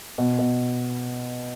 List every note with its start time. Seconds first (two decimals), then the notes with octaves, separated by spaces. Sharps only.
0.18 B2
0.39 B2